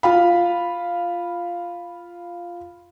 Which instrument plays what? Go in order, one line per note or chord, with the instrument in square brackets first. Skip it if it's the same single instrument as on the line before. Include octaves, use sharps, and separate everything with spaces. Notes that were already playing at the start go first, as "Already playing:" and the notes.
[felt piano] F4 F5 B5